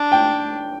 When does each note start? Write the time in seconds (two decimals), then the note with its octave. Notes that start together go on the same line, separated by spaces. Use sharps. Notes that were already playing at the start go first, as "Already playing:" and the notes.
Already playing: D4
0.12 G5